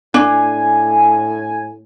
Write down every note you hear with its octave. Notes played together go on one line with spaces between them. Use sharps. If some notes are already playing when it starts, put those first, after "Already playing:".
A2 D4 G#5